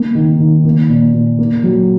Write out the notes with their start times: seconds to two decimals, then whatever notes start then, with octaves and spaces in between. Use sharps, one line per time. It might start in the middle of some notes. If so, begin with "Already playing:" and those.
Already playing: A#3
0.15 D#3
0.40 D#3
0.65 A#3
0.89 A#2
1.14 A#2
1.39 A#3
1.63 F#3